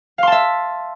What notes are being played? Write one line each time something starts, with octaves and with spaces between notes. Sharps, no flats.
E5 F5 A5 C6